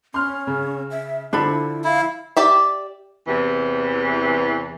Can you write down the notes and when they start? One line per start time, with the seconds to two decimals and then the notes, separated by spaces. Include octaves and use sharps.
0.14 C#4 C6 F6
0.47 C#3
0.91 E5
1.33 D3 F3 D4 E4 A4 B5
1.84 E4 F5
2.37 G4 D5 E5
3.27 E2 C3 E3